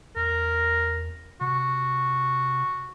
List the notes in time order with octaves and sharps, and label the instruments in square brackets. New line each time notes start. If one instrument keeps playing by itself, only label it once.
[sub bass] E2 [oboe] A#4
[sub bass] C3 [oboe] F#4